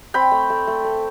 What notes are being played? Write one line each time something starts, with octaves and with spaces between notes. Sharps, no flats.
C4 G5 B5
A3
A3
A3
A3